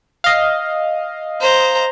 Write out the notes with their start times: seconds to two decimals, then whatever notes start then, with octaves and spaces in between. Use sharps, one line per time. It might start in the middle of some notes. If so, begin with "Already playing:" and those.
0.24 D#5 F5
1.41 C5 A#5